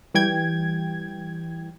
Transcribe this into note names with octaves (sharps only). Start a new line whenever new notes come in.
E3 G3 G5 G#6